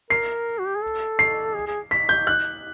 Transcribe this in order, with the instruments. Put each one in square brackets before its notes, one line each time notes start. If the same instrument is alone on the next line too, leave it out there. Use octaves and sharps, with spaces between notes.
[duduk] A#4 [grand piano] C7
[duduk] F#4
G4
G#4
A4
[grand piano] C7
[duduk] G#4
G#4
[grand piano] B6
G6
F#6